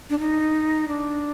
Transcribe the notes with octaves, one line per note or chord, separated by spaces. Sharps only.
D4
D#4
D4